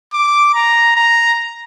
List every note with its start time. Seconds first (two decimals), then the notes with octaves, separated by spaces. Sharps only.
0.13 D6
0.54 A#5
0.96 A#5